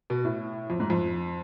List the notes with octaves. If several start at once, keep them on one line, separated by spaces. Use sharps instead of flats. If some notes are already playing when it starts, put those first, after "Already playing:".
B2
A2
F2
G#2
F2